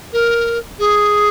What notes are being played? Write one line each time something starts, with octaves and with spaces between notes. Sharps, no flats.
A#4
G#4